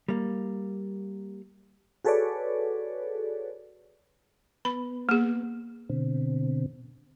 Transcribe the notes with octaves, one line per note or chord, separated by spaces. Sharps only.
G3 A#3
F#4 G#4 A4 B4 C#5 D5
B3 B5
A#3 G#4
B2 D3 C4